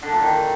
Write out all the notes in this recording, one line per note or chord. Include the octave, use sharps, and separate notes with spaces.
D3
A#2
D#3